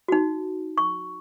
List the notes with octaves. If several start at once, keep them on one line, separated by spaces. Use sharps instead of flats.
D#4 F#4
C#6